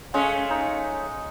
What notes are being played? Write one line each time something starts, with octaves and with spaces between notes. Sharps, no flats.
G#3 A3 C#4 F5
D#4